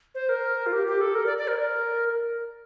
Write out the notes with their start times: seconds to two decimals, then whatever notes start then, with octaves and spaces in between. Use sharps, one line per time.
0.15 C5
0.29 A#4
0.66 F4
0.73 G4
0.87 G4
1.01 A4
1.15 A#4
1.26 D5
1.38 D5
1.48 A#4